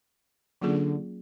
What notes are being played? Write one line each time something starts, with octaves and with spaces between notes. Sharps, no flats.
D3 F#3 A#3 C#4 F4 G#4